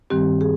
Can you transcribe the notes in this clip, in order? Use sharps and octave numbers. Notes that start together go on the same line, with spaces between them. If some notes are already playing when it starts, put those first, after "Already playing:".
G2 D#3 G3 C4 G4
G#4